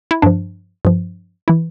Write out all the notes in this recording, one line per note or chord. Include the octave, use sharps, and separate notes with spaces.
E4
G2 F3 D4
G2 F3
E3 E4